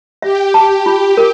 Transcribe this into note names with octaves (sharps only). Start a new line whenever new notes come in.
G4 E5
A5
F4
A#4